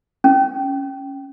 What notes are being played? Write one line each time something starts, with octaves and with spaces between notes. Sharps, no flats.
C#4